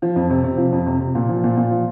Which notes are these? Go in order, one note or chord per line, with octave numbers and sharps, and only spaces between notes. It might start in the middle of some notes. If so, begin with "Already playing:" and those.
F3
F2
C3
C3
F3
F2
C3
C3
A#2
F3
A#2
A#2
F3